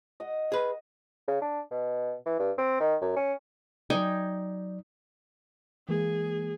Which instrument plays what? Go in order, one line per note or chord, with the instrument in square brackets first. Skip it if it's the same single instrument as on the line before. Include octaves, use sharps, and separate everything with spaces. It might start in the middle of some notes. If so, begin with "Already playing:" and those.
[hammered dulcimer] D#5 F#5
[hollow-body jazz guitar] G#4 B4
[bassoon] C#3
D4
B2
E3
G2
C4
D#3
F#2
C#4
[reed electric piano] F#3 D5 [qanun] D#4 G5 G#5
[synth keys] E3 G#3 A#3 [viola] G#4